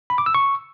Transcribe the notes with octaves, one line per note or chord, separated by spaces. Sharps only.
B5
D6
E6
C#6